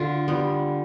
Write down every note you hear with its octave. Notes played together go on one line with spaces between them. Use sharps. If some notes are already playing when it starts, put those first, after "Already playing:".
Already playing: D3 F4
G3 B3